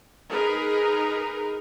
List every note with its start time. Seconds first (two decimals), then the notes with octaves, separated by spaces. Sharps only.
0.29 D#4 G#4 A#4 B4 D#5